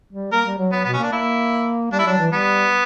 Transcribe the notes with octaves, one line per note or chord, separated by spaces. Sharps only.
G3
A#3 A#4
G3
F#3
F#3 B3
B2 B3
C#4
A#3 D4
A#3 E4
G3 D4
E4
F#3 D4
E3
G3 B3